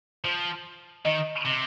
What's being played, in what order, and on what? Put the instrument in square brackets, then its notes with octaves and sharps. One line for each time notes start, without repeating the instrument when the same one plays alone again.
[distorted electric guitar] F3 [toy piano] C5
[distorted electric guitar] D#3 [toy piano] D#5
[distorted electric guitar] C3